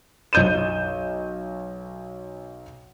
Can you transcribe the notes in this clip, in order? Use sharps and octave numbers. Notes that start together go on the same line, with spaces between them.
B1 D#5 G6 D#7 E7